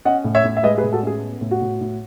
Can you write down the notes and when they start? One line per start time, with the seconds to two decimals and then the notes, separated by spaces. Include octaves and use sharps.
0.05 C#4 D#5 F#5
0.24 A2
0.35 C#5 E5
0.44 A2
0.57 E5
0.63 G#3 B4 D#5
0.78 G#4 B4
0.84 A2
0.93 F#4 A4
1.03 C#4 G#4
1.23 B3
1.41 A2
1.51 F#4
1.61 A2
1.81 A2